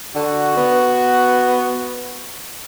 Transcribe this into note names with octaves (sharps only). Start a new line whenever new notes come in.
D3 F#4
B3